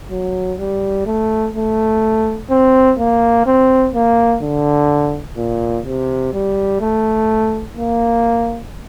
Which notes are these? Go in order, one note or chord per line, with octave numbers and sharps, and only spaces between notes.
F#3
G3
A3
A3
C4
A#3
C4
A#3
D3
A#2
C3
G3
A3
A#3